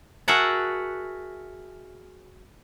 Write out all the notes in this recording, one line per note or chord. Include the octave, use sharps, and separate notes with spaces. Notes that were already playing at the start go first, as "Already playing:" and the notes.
F#4 G#4 A#4 E5 F#5 A5